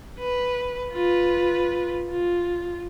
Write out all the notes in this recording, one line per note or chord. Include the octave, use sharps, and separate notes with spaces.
B4
F4 B4
F4